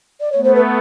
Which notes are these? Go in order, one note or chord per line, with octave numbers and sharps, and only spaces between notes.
D5
A3 B3 C#5
C5
B4